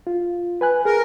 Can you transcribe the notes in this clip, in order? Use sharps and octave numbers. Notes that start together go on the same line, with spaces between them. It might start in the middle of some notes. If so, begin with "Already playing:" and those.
F4
B4 G#5 F#6
G#4 A#4